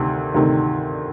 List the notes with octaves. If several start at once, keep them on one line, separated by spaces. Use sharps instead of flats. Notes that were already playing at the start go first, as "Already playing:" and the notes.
Already playing: D2 C3 D#3
D2 C3 D#3